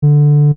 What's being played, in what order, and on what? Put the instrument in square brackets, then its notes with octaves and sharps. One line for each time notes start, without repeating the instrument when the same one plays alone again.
[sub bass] D3